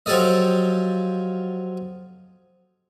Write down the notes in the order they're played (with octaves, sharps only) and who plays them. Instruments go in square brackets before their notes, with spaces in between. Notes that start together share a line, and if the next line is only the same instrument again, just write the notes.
[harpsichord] F3 F#3 G4 A4 D5 D#5